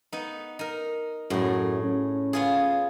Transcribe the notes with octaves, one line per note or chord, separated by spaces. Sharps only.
B3 D#4
D#4 A#4
F#2 A2 G#4
C#4
B3 F4 G#4